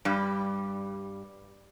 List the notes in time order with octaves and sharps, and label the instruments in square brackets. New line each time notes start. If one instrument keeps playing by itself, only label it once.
[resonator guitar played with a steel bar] G2 G3